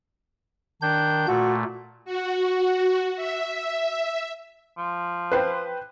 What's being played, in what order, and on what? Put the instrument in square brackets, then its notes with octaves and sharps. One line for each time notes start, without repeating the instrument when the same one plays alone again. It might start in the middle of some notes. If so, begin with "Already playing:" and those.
[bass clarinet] D#3 [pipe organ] D4 G6
[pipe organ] A#2 A3 [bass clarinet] F#4
[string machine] F#4
E5
[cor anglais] F3
[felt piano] B4 C5 G5